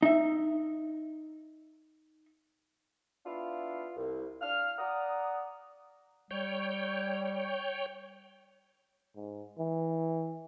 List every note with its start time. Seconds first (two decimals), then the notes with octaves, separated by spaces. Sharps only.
0.02 D#4 E5
3.25 B3 D4 E4 F4 F5
3.97 C2
4.41 D4 F5 F6
4.79 D5 F#5 A#5 D#6
6.31 G3 C#5 G5
9.16 G#2
9.58 E3